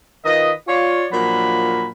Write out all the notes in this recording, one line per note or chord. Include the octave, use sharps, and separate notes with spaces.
D#3 F4 A#4 B4 D#5
F4 C#5 D5
A#2 F3 F#3 D4 A#4 B5